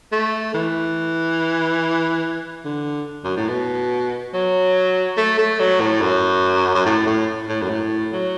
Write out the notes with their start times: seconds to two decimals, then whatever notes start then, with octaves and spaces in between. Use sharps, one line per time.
0.12 A3
0.54 E3
2.65 D3
3.24 F#2
3.37 A2
3.49 B2
4.33 F#3
5.17 A3
5.39 A3
5.60 F#3
5.80 A2
6.02 F#2
6.75 F#2
6.86 A2
7.07 A2
7.48 A2
7.62 F#2
7.69 A2
8.12 F#3